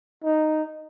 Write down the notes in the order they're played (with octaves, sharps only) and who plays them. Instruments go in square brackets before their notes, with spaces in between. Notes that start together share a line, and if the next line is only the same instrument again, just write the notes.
[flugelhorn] D#4